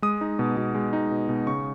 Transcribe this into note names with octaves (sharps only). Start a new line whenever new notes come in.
G#3 D#6
D#4
B2
B2
G#3
D#4
B2
B2
C#3 C#6